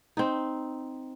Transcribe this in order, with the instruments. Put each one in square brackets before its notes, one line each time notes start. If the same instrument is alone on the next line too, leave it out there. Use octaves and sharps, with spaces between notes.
[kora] C4 D#4